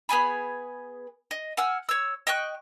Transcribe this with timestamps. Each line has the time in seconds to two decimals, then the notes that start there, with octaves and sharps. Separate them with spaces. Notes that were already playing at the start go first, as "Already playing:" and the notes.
0.09 B3 G#4 G#5 B5
1.31 D#5
1.57 F#5 G#5 E6 F6
1.89 C#5 E6
2.27 D#5 G5 C#6 F#6